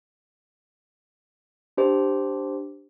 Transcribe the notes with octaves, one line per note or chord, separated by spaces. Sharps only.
D4 G4 C5